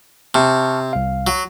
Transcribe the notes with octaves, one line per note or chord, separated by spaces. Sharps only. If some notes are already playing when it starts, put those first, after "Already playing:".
C3 A5 C#6 F6
C2 F5
F#3